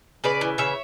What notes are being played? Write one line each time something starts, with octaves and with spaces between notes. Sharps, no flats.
C#3 B4 D5
E3
C#3 C#5 E5